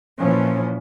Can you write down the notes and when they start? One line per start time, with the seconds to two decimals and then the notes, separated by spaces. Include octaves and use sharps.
0.17 A#2 E3 F3 C#4